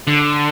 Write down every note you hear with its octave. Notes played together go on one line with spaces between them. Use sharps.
D3